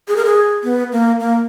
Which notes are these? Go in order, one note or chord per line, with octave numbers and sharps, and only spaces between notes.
G#4
A#4
G#4
B3
A#3
A#3